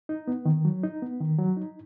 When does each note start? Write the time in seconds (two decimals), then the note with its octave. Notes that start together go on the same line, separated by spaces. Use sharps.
0.09 D#4
0.28 B3
0.45 D#3
0.65 F#3
0.83 D#4
1.02 B3
1.21 D#3
1.39 F#3
1.57 D#4